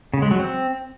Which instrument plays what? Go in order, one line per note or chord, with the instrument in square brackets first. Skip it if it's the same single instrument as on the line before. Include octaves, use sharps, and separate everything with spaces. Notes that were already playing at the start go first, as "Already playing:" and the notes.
[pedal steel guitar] C#3
G#3
F#3
C4